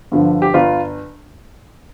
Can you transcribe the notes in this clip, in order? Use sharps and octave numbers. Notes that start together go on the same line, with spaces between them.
G2 D3 F3
G4
G1 F4